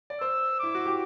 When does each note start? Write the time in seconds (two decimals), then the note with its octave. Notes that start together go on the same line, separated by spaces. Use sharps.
0.10 D5
0.21 C5 E6
0.59 E4 D6
0.75 F#4
0.86 G4